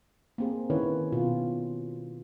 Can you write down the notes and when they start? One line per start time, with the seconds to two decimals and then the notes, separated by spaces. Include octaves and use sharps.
0.38 A#3 C4 G#4
0.70 D#3 C#4 E4 B4 C#5
1.12 B2 F4